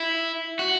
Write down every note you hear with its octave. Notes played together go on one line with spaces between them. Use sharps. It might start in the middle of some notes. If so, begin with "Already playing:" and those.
Already playing: E4
F#4